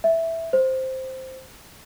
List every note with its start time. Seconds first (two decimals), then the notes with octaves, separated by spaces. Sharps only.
0.04 E5
0.53 C5